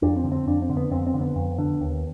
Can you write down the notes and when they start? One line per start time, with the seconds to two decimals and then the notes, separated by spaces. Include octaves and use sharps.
0.02 F2 D4
0.17 C4
0.24 D3
0.32 C4
0.47 F2 D4
0.62 C4
0.70 D3
0.77 B3
0.91 F2 C4
1.07 C4
1.14 D3
1.21 B3
1.36 F2
1.58 D3
1.81 D#2